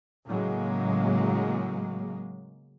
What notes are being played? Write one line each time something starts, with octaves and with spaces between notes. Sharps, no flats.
A2 C#3 F#3 G#3 A#3